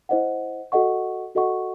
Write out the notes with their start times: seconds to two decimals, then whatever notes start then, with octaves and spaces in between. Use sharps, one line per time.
0.09 E4 C5 D#5 F#5
0.72 F#4 A4 D#5 F#5 C#6
1.35 F#4 A4 D#5 F#5 C#6